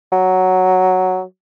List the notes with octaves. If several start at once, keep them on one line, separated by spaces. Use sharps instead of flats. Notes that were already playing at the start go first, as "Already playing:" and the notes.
F#3